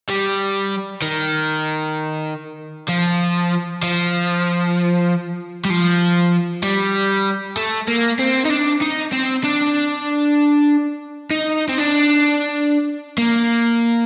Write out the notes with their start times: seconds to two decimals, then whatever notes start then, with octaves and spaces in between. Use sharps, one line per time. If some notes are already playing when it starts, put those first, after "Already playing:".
0.09 G3
1.02 D#3
2.89 F3
3.83 F3
5.65 G3
5.70 F3
6.63 G3
7.57 A3
7.88 A#3
8.19 C4
8.45 D#4
8.50 D4
8.81 D#4
9.13 C4
9.44 D4
11.31 D#4
11.69 C4
11.78 D4
13.18 A#3